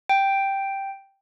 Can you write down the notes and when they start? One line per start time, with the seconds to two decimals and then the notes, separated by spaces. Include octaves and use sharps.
0.09 G5